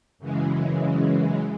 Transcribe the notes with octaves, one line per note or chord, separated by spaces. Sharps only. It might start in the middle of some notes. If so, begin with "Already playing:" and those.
F#2 C#3 E3 G#3